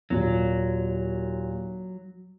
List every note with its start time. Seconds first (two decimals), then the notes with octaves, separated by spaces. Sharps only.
0.10 D#2 A#2 F#3